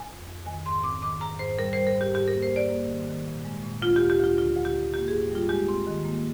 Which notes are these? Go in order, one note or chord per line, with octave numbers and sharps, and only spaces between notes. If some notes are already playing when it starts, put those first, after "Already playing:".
Already playing: G#5
F2
F2
D#3 G#5
G#2 C6
C4 D6
D#3 D6
G#2 A#5
G#2 C5
G3 A#4
G3 C5
A#4
G#2
G4
G#2 G4
A#3 A#4
C5
A#3 D5
A#3
D#3
D#3
A#2
G#3
A#2
D2 F4
G4
D2
G4
D2 F4
D3 F4
D2
G4
D3
A#3 G4
G#2 G#4
G3 F4
G#3 G4
C4
D#3
A#3